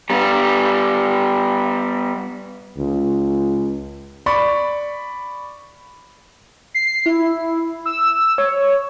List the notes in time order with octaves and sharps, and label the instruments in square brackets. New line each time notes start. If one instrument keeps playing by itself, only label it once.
[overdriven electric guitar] G3 B3
[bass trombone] C#2
[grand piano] D5 B5 C#6
[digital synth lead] C7
E4
E6
C#5